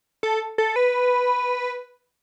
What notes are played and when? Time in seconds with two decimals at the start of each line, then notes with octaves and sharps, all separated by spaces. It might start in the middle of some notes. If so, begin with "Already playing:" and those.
0.23 A4
0.58 A4
0.76 B4